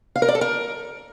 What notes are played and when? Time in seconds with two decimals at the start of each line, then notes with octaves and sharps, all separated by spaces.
0.16 F5
0.22 A#4
0.28 D5
0.35 A4
0.41 A#4